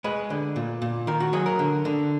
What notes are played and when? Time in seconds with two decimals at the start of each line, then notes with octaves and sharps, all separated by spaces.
0.04 G#3 B4
0.30 D3
0.56 A#2
0.82 A#2
1.07 D#3 A#4
1.20 F#4
1.33 F#3 G#4
1.46 A#4
1.59 D3
1.85 D3